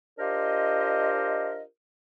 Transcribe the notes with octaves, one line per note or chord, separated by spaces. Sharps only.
D4 F4 G4 A#4 C5 D#5